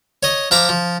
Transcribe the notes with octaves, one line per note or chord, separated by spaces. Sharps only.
C#5 D#5
F3 E5 A#5 D6
F3